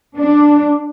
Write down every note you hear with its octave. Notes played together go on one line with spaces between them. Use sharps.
D4